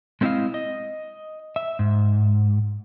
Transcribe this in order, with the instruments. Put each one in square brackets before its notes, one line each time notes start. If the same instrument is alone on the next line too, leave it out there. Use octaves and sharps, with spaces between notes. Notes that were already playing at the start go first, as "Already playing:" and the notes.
[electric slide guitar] G#3 A3 C4 E4 D#5 F5
D#5
E5
G#2